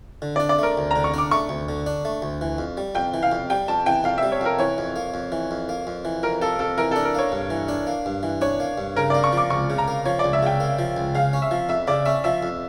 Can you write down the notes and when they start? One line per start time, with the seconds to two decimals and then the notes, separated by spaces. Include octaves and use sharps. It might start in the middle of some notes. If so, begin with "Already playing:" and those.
0.22 D3
0.36 D4 D5
0.49 D5
0.59 A3 A#4
0.77 D2
0.91 D3 A#5
1.04 C#6
1.14 D4 D6
1.31 A3 C#6
1.49 D2
1.69 D3
1.86 D4
2.05 A3
2.22 D2
2.41 E3
2.58 F2
2.77 G3
2.95 F2 G5
3.14 E3
3.23 F5
3.32 F2
3.50 G3 G5
3.68 F2 A5
3.86 E3 G5
4.04 F2 F5
4.18 E5
4.23 G3
4.32 C#5
4.41 F2 A#4
4.59 E3 C#5
4.78 F2
4.96 A#3
5.14 F2
5.32 E3
5.51 F2
5.69 A#3
5.87 F2
6.05 E3
6.23 F2 A#4
6.41 A#3 A4
6.59 F2 A4
6.78 E3 A#4
6.91 D4 A4
7.05 A#4
7.15 A#3 C#5
7.32 G2
7.50 E3
7.68 D4
7.87 A#3
8.06 G2
8.23 E3
8.41 D4 C#5
8.60 A#3
8.78 G2
8.96 C#3 A#4
9.10 A#3 D5
9.24 C#6
9.33 F3 D6
9.50 C#2 C#6
9.70 C#3
9.78 A#5
9.88 A#3
10.06 F3 C#5
10.19 D5
10.24 C#2
10.33 E5
10.43 C#3 G5
10.60 A#3
10.79 F3
10.97 C#2
11.15 C#3 F5
11.33 C#4
11.42 E5
11.51 F3
11.69 F2 E5
11.87 C#3 D5
12.05 C#4 E5
12.24 F3 E5
12.43 F2